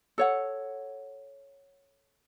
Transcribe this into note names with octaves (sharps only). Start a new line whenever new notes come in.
A4 C#5 F#5